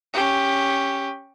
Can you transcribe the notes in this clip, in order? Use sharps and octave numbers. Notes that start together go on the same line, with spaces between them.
C#4 G4